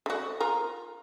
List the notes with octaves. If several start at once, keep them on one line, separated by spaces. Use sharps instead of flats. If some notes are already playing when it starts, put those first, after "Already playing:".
D3 F#4
F4 A#4